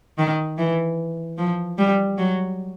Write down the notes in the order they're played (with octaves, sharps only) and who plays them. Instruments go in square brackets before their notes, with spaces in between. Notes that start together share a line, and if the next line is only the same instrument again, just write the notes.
[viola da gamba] D#3
E3
F3
G3
F#3